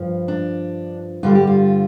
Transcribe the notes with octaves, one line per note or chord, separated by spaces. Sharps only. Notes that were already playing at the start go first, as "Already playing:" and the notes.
Already playing: G2 F3
D4
G2 D3 G3 F4
G4
F4